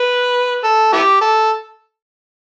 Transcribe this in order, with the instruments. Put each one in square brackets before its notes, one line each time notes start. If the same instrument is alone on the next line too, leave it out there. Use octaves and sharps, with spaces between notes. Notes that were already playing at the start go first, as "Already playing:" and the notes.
Already playing: [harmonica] B4
A4
B3 E4 G4
A4